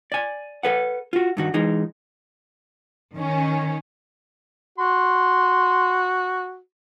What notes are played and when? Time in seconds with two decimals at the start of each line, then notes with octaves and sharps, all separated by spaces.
0.12 D5 G#5
0.63 A4 B4 F#5
1.13 F4 F#4
1.37 G2 D#3 F#4
1.54 E3 G#3 D#4
3.15 D#3 C#4
4.78 F#4 C6